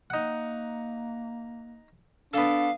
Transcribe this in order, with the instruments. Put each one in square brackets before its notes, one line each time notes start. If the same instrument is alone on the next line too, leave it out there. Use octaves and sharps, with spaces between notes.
[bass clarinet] A#3 [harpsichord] D#4 F#5
[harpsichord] B3 A4 [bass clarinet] D4 [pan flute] F5